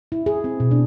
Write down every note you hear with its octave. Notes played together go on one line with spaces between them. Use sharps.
E4
G#4
C4
B2
D4